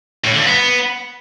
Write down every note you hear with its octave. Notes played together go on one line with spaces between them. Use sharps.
A2
D3
G2
B3